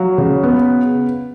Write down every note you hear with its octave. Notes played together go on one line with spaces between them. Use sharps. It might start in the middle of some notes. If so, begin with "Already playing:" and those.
Already playing: F#3 F5
C#3
B3